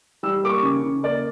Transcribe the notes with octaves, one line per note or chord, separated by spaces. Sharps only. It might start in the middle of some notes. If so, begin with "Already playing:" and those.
G3 E6
A#3 D6
C#6
C#3
C#3
A#3 D5